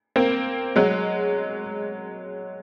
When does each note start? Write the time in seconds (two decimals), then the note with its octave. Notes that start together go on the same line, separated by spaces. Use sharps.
0.16 A#3 C4
0.76 F#3 G#3